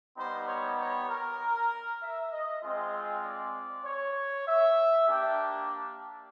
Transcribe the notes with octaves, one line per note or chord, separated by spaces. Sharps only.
G3 B3 D#4 C5
C#5
C#5
A#4
E5
D#5
G#3 C4 F4 D#5
D5
C#5
E5
A#3 D4 G4 G5